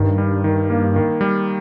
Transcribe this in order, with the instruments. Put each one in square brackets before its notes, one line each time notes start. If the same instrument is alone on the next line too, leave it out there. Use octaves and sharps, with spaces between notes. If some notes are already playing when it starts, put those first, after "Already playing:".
Already playing: [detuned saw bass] G2 [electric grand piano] D#3
[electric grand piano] G3
D#3
A#3
D#3
G3